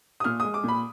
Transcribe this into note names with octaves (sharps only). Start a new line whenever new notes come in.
D#6
A#2 F6
G#3 D#6
D6
A#2 B5